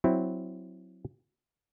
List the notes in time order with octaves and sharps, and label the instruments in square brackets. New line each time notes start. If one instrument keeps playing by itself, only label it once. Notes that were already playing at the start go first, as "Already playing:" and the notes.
[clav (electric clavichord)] F#3 C4 E4